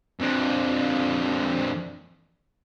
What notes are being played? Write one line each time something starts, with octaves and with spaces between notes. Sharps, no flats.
F2 D3